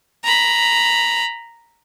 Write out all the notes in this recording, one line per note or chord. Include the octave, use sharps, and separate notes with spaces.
A#5 B5